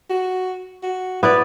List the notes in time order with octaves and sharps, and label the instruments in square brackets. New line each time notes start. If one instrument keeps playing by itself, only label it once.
[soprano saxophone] F#4
F#4
[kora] B3 E4 D5 [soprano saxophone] B4